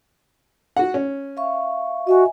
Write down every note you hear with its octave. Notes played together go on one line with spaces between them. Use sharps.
F#4 F#5
C#4
E5 F5 C#6
F#4 D#5 E5 G#5